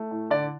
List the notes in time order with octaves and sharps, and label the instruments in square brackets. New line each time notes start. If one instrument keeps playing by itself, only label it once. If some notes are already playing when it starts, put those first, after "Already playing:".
Already playing: [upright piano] A3
A2
D3 D5